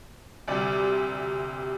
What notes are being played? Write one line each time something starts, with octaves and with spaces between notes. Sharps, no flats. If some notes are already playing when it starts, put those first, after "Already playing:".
D2 C3 G3 D5